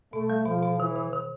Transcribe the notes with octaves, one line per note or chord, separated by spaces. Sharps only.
B2 A3
G3
B2 F3
B2
D#3 E3
D#3
D#3